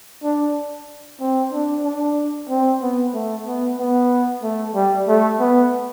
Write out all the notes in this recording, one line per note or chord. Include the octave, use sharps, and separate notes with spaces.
D4
C4
D4
D4
C4
B3
A3
B3
B3
A3
G3
A3
B3